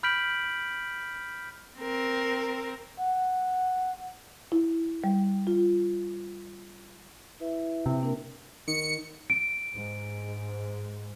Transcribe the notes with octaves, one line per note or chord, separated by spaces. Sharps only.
B5 F6 G6 B6 D7 F#7
C4 A#4
F#5
E4
G3
F4
E4 B4 E5
C3
A#3 D4 A#4
D#3 C#7
D7
G#2